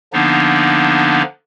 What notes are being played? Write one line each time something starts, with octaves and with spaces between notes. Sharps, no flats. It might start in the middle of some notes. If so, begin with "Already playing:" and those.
D3 F3 A#3 B3 D4 D#4